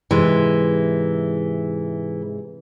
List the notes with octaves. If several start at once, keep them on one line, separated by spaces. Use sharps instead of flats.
G#2 C3 E3 G#3